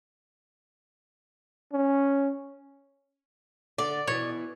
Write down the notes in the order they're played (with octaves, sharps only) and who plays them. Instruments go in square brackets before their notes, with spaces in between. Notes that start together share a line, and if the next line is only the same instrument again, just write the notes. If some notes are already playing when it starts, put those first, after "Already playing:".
[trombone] C#4
[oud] D3 [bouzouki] D5
[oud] B2 E3 [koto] C#5